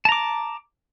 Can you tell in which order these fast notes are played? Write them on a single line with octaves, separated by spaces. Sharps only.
A5 A#5 D6